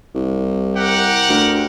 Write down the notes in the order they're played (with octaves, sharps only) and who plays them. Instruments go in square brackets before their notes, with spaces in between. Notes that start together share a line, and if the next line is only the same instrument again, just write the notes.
[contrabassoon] C2
[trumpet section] G4 A#4 F#5
[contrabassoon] D2